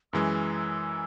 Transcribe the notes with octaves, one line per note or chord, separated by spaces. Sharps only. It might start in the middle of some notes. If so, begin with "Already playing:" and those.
F#2 E3 G#3 E6
E6